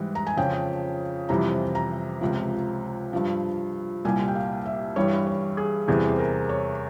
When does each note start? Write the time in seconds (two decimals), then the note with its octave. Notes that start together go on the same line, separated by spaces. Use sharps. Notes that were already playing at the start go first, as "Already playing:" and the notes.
Already playing: G#2 E3 G3
0.15 A#5
0.27 G#5
0.37 F2 C#3 F3 G5
1.29 F2 C3 E3 G3 A#5
1.75 A#5
2.21 C#2 C3 F3
3.13 G2 F3
4.05 C2 A#2 G3 G#5
4.28 G5
4.35 F5
4.66 E5
4.96 G2 E3 G3 C#5
5.27 C#5
5.57 G#4
5.88 E2 C3 E3 G3 G#4
6.08 C5
6.19 A#4
6.49 C#5